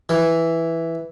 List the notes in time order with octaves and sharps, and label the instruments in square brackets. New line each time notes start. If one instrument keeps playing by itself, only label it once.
[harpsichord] E3